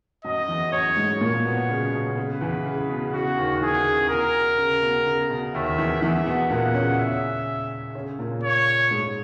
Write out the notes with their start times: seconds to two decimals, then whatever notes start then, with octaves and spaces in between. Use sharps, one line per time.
0.24 F#2 F#3 D#5
0.48 E2 E3
0.72 F#2 F#3 C#5
0.97 G#2 G#3
1.21 A#2 A#3 C#5
1.45 B2 B3
1.69 C#3
1.93 B2
2.17 C#3 B4
2.41 E2 E3
2.66 C#3
2.89 B2
3.13 C#3 F#4
3.38 D#2 D#3
3.61 E2 E3 G#4
3.86 C#3
4.09 B2 A#4
4.58 C#3
4.82 B2
5.06 C#3
5.30 B2
5.54 D#2 D#3 E5
5.78 E2 E3
6.02 E2 E3 E5
6.26 B2 B3
6.50 A#2 A#3 F#5
6.74 C#3 C#4
6.98 E5
7.95 C#3 C#4
8.19 A#2 A#3
8.43 C#5
8.91 G#2 G#3